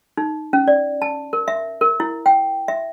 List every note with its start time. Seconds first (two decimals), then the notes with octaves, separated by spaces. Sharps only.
0.17 D#4
0.53 C#4
0.68 D5
1.02 A5
1.33 A#4
1.48 E5
1.81 A#4
2.00 E4
2.26 G5
2.68 E5